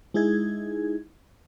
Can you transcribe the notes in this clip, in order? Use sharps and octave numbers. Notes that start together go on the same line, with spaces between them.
G#3 D#4 E4 G#4 G#6